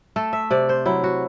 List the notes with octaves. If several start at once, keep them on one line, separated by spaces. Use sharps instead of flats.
A3 A4
E5
C3 D5
C5
F#3 E4
F#4